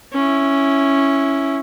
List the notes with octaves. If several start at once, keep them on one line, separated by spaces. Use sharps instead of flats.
C#4 E4